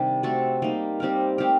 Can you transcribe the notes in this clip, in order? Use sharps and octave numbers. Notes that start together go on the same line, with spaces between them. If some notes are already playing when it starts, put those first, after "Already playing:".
Already playing: C3 D#3 G3 D4
A3 C4 F#4 A4
G3 A#3 D#4
G3 C4 G4 A#4
A3 C4 G4 A#4